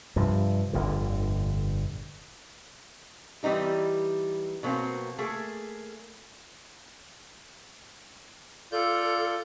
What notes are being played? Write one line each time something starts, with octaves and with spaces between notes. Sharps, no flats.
G2 C3 F3
G1 F2 A#2 D3
E3 G3 C4 D#4 G4
B2 F#3 A#3 C4
A3 A#3 G#4
F4 A4 D5 G6